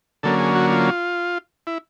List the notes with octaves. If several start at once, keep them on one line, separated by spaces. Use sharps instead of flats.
D3 F#3 A#3 C#4 A4
G#4
F#4
F4
E4